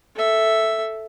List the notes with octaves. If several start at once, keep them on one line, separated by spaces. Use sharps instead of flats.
A4 E5